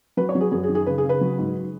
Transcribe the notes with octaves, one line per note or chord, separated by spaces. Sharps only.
F#3 B4
C#5
F#3
G#4
F#2 G#4
G#4
D#3
G#4
C#3 B4
G#4
C#3
B4
F#3
G#2